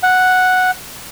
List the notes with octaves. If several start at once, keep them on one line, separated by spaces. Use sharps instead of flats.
F#5